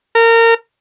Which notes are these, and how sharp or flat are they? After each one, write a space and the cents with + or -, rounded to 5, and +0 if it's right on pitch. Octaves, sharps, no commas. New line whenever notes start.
A#4 -25